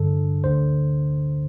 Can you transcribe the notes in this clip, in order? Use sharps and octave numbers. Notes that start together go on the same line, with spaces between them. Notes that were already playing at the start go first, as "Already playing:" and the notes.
Already playing: G2 D3 A4
D2 D3 C5